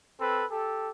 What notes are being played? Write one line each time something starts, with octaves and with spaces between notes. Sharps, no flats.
C4 A4 B4
G4 A4